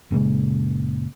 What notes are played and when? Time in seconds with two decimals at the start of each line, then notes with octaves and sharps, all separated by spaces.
0.11 F#1 A#2 C#3 G#3